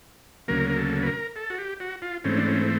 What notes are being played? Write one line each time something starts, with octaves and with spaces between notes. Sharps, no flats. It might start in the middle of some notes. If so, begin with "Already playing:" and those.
D2 C#3 F#3 A#3 A#4
A#4
A4
B4
A#4
A4
F#4
G4
F#4
F4
G#2 E3 A3 C4 C#4
D4
C#4